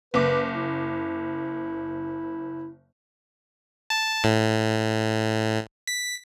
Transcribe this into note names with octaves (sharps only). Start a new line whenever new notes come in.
F#1 B4 D6
E4
A5
A2
B6